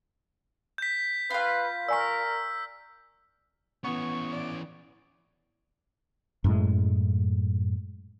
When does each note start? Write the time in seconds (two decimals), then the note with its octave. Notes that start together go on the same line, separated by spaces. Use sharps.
0.78 G6 B6
1.30 F4 B4 F5
1.88 A#4 D5 G#5 C#6 E6 B6
3.84 E3 B3 C#4 C#6
4.32 D5
6.44 F#2 A2 G#3